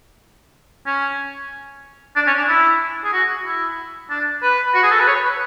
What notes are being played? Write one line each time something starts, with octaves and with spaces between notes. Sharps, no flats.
C#4
D4
C#4
D4
E4
G#4
F#4
E4
D4
B4
F#4
G#4
A4
B4
C#5
B4